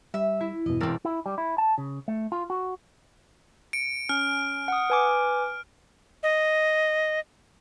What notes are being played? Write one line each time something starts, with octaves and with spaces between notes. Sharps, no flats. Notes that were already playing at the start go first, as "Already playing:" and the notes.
G3 E5
E4
E2 G2 B2 D#5
E1 C4 A#4 D5 E6
E4
G3
E4
A5
C#3
A3
F4
F#4
C#7 D7
C#4 F6
F#5 D#6
B4 G#5 D6
D#5